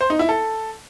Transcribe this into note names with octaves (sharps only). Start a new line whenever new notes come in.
C5
D#4
E4
A4